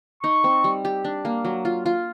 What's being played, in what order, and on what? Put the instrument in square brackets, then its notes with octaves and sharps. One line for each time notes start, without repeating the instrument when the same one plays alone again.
[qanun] D#4 [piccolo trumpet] C#6
[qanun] C4
G3
G4
D4
A#3
F#3
F4
F4